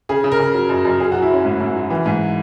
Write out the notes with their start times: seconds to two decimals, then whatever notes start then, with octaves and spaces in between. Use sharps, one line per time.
0.09 C#3 G#4
0.24 C#3
0.32 A#4
0.40 C#3
0.54 F#3
0.69 F#2
0.85 F#2
1.00 F#3 G#4
1.12 F#4
1.15 F#3
1.22 E4
1.30 F#3 C#4
1.45 G#2
1.61 G#2
1.76 F#3
1.90 E3
2.06 G#2